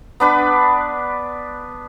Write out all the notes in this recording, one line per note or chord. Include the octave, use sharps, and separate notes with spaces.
B3 D4 B4